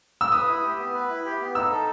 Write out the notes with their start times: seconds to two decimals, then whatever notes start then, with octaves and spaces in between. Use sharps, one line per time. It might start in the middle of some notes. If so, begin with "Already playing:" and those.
0.21 E6
0.32 B4 D#6
0.48 E4
0.63 G4
0.79 B3
0.94 B4
1.09 E4
1.25 G4
1.41 B3
1.55 D#4 E6
1.71 A4